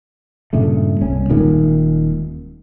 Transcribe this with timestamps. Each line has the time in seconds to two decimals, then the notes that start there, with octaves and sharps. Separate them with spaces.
0.53 G2 A#2 C#3 A3
1.01 C2 C#4
1.29 D#1 A#2 D#3 G#3